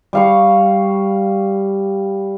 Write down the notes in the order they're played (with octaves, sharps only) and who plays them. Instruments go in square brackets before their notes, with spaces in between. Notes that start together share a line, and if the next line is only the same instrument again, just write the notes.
[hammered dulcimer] G3 F5 C#6